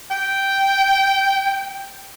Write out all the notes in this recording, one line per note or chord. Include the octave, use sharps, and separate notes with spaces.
G5